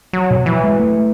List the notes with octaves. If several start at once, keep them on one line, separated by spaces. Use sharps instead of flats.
F#3
B2
E3 F#3
G#3
A3